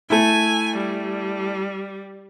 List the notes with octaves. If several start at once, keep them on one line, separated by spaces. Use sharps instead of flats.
A3 E4 G#5
G3